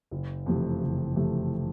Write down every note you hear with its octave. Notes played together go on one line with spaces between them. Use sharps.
F#1
F2 C3 E3 A3
F#1
F2 C3 E3 A3